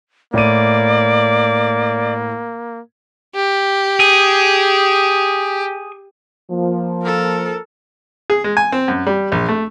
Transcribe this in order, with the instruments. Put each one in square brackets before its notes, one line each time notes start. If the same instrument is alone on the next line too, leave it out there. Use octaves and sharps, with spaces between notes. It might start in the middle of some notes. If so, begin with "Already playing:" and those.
[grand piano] A2 D#7 [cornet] A#3 [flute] D5
[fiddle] G4
[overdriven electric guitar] G#4
[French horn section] F3 A#3
[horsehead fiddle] A4 A#4
[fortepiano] G#4
G#3
G#5
C4
F#2
G3
A#1
A3